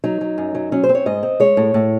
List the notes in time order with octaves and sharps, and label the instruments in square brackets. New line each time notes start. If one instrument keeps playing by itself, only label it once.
[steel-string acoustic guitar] F#3 D#4
F#3
F#2
F#3
F#3 C#4
C5
C4
C#5
G#2 D#5
C4
G#3 C#5
A2
A2